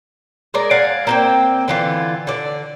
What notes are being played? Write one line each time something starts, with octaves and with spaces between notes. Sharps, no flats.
G#3 A#4 D5
D5 F5 F#5 G#5
A#3 C4 G5
D3 E3 F4
D3 D5